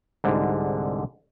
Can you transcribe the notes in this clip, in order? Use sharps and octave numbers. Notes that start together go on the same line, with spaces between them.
C2 G#2 D3